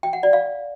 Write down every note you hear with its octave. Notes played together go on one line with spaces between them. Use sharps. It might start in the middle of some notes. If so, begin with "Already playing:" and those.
G5
F#5
D5
F5